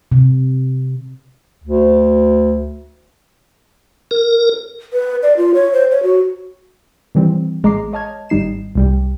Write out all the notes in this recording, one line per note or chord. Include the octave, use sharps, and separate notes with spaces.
C3
D2
A#4
B4
D5
F4
C#5
C5
C#5
F#4
D#3 E3 G3 C4
A1 G#3 A#5 D6 C7
C#5 D#5 A5 F6 G#6
G#1 G3 D#4 C7 E7
C2 G3 G4